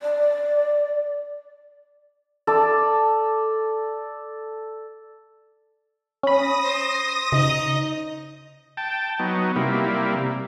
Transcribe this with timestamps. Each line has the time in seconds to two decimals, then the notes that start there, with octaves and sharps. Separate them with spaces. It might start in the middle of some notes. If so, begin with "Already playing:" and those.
0.02 D5
2.47 A4 D5
6.23 C#4 B5 D#6 A#6
6.63 C5
7.32 C#3 D#4 D#5
8.77 G5 A5
9.19 F#3 B3 D#4
9.56 C3 G3 A#3 E4